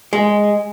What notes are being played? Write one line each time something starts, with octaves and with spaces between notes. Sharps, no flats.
G#3